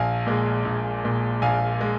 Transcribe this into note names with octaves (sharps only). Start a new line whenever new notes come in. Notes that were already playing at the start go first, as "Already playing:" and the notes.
Already playing: A#1 F5 G#5
A#2 G#3
A#1
A#2 G#3
A#1 F5 G#5
G#3